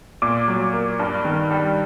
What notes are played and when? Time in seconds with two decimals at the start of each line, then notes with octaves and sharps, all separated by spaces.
0.22 A#2 D6
0.48 F#3
0.73 A#3
0.99 G2
1.25 D#3
1.51 G3